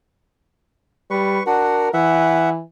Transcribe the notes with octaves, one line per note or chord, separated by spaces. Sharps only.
G3 B4 C#6
D4 F#4 A#4 F#5
E3 E5 F#5